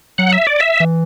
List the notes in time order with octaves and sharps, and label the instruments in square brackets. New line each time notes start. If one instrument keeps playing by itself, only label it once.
[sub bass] F#3 [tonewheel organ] F#5
[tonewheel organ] E5
D5
E5
[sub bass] E3